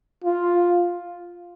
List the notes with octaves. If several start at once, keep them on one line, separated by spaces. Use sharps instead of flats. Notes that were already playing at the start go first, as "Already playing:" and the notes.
F4